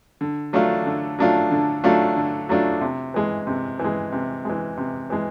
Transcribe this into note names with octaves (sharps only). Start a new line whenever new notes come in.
D3
F#3 A3 D4 F4
D3
F#3 A3 D4 F4
D3
F#3 A3 D4 F4
D3
F#3 A3 D4 F4
C3
E3 G#3
C3
E3
G#3
C3
E3 G#3
C3
E3 G#3